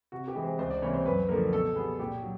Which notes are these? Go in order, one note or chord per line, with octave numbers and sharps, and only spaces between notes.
C3 F#4
G4
E3 G#3
C5
C#2 C5
D5
C3 E3 G3 A#3 C#5
C5
F#2 B4
D3 F3 A#3 A#4
B2 A4
G3 B3 G#4
A#2 G4
F#3